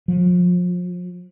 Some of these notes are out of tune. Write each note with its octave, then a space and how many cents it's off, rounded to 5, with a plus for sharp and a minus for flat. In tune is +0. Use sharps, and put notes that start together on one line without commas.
F3 +35